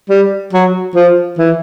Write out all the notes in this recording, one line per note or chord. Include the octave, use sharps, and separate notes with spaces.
G3
F#3
F3
E3